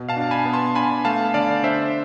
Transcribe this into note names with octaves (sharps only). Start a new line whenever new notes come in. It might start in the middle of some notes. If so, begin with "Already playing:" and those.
Already playing: B2
F5 A5
D4
G#5 B5
B3
A5 C6
D4 G#5 B5
A3 F5 A5
D3 D5 F5
D4 C5 E5